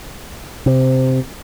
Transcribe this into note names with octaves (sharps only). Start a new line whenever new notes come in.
C3